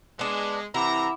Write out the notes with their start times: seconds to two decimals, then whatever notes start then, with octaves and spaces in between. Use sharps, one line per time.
0.19 G#3 B3 D4
0.74 C3 E3 E4 F#5 A#5 B5 D6